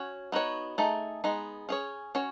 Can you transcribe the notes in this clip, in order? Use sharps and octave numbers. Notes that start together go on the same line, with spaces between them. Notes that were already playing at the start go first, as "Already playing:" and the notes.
Already playing: C#4 F#4 C#5
B3 D#4 F#4 C#5
A3 D#4 G#4
G#3 B3 D#4
C#4 G#4 C#5
C#4 F#4 C#5